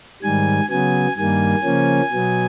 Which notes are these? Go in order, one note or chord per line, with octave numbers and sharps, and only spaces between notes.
G#2 D#3 G3 G#5
C#3 F#3 B3 G#5
G2 D#3 G3 A#3 G#5
C#3 F3 A#3 C#4
B2 F#3 B3